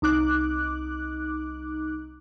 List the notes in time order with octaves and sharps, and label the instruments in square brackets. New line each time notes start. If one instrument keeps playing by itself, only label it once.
[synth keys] C2 D#4 D6 F#6